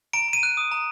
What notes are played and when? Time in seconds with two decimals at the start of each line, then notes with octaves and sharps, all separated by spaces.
0.13 A#5 D7
0.28 A#5 D#7
0.43 F#6
0.57 D#6
0.72 A#5